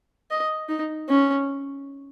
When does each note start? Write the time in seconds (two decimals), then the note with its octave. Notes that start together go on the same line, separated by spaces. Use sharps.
0.31 D#5
0.69 D#4
1.09 C#4